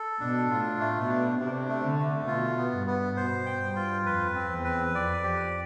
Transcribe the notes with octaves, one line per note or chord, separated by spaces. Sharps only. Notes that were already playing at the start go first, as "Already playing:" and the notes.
Already playing: A4
B2 D4
A2 F4
A3
B2
D4
C3 D4
A3
D3
A3
B2 F4
B3
G2
B3
B2 C5
G5
G2
F4
F2 B4
C4
E2
B4
F2 D5
G4